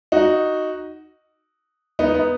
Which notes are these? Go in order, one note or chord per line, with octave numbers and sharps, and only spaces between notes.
D#4 F#4
B3 D#4
B3 D#4